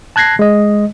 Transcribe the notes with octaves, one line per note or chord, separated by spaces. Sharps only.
A5 F#6 G#6 A#6 C7
G#3 D#5